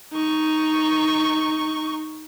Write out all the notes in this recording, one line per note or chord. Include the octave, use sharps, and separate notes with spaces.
D#4 C#6